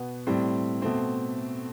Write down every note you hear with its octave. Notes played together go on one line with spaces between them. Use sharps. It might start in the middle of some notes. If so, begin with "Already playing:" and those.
Already playing: B2 B3
A2 G3 C4
B2 A3 C4